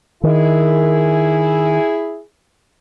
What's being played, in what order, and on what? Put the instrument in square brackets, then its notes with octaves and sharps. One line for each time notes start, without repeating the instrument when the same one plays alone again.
[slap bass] D#3 [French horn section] E4 G#4